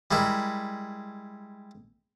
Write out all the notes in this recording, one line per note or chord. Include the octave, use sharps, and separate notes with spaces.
G3 G#3 E4 A#4